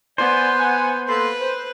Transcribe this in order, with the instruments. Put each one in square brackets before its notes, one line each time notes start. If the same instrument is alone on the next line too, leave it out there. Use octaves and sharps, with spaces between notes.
[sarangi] B3 [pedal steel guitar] C5 [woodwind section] D5 G#5
[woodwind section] F#5 G#5
[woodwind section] A#3 A4 C6 [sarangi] B4
[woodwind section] C5